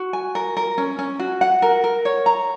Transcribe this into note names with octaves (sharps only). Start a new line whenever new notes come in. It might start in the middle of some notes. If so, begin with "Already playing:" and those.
Already playing: F#4
G#5
A#4
A#4
C#4
C#4
F#4
F#5
A#4
A#4
C#5
A#5